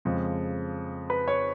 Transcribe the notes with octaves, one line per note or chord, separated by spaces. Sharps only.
F2 C#3 F3 G#3
B4
C#5